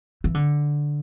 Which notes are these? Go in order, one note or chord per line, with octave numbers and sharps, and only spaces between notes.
E3
D3